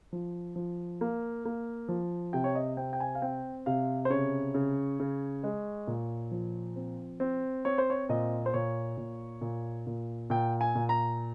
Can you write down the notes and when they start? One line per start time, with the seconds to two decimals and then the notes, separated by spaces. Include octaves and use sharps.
0.13 F3
0.56 F3
1.01 A#3
1.45 A#3
1.89 F3
2.33 C3 G5
2.44 C#5
2.55 D#5
2.77 C4 G5
2.93 G5
3.00 G#5
3.15 F5
3.22 C4 G5
3.66 C3 F5
4.05 C5
4.10 C#3 C#5
4.54 C#3
5.00 C#3
5.44 G#3
5.87 A#2
6.31 F3
6.76 C4
7.20 C4
7.65 C4 C#5
7.78 C5
7.90 C#5
8.09 A#2 D#5
8.46 C5
8.54 A#2 C#5
8.97 A#2
9.41 A#2
9.87 A#2
10.30 A#2 G5
10.61 G#5
10.75 A#2
10.89 A#5